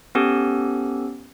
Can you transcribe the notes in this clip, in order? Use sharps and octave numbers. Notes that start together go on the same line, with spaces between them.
B3 C#4 G4 A4